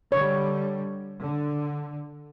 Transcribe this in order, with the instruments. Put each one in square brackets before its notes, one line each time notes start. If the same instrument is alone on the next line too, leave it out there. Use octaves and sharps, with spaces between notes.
[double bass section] D3 G3 [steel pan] C#5
[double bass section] D3